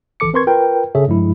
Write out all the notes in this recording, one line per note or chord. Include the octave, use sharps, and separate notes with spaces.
G#1 D#3 E3 A4 D6 C#7
C4 A#4 B4 C6 C#6 G#6
F4 A#4 B4 G5
G#1 C#3 G#4 A4 C#5 E5
G2 F3 G#3 E4